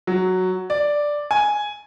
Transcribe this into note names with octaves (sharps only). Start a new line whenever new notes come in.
F#3
D5
G#5